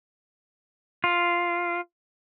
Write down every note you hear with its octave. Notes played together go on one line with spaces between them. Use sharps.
F4